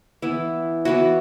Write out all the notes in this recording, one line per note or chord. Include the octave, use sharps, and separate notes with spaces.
E3 B3 E4
E3 B3 E4 F#4